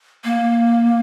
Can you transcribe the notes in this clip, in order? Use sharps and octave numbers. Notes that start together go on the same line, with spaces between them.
A#3